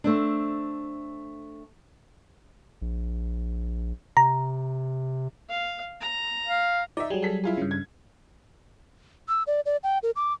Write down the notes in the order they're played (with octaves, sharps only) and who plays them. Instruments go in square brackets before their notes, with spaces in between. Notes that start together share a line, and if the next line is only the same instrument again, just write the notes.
[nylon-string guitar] A3 C4 D4
[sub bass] A#1
[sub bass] C3 [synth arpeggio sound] A#5
[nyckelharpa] F5
A#5
[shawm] F5
[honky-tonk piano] D#4 E5 [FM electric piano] D5
[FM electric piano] F#3 G3 [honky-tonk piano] G#4
[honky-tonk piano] G#4 A4 B6
E4 F4 G#4
[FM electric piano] G2 C#3
[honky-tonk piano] G#6
[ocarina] E6
D5
D5
G5
A#4
D6